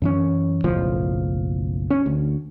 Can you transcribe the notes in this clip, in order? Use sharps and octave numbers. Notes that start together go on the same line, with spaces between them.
F#2 E3 C#4
F#1 B1 A2 F3
C#4
D2